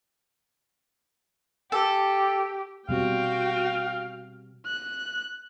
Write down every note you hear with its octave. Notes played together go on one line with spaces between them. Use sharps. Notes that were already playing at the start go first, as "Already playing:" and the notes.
G4 A4
B2 G3 C4 F#4 F5 G5
F#6